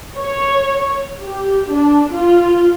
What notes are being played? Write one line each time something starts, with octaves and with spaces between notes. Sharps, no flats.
C#5
G4
D4
F4